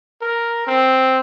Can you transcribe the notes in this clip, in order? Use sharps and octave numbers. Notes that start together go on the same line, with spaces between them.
A#4
C4